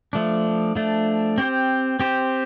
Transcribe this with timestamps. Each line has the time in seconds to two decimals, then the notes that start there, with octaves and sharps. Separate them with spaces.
0.13 F3 A3 D4
0.75 F3 A3 D4
1.38 C4 G4 C5
2.00 C4 G4 C5